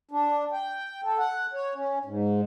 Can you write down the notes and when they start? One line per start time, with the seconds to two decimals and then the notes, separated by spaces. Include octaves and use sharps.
0.11 D4
0.53 G5
1.04 A4
1.19 F#5
1.53 C#5
1.75 C#4
2.05 G#2